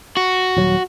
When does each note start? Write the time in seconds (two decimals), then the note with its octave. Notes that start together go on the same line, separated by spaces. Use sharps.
0.17 F#4
0.56 D#1 F#3